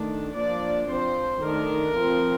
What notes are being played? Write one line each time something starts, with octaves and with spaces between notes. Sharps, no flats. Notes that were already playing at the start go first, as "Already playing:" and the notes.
Already playing: D#3 A3 D4
F3 A#3 D4 D5
F3 C4 C5
D#3 A3 D4 A#4
F3 C4